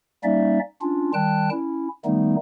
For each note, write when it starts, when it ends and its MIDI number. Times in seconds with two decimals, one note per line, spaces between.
0.24 0.59 55
0.24 0.59 58
0.24 0.59 61
0.24 0.59 63
0.24 0.59 74
0.24 0.59 76
0.82 1.11 61
0.82 1.11 62
0.82 1.11 65
1.14 1.49 51
1.14 1.49 55
1.14 1.49 79
1.14 1.49 81
1.14 1.49 90
1.51 1.88 61
1.51 1.88 64
2.05 2.36 51
2.05 2.36 55
2.05 2.36 57
2.05 2.36 59
2.05 2.36 63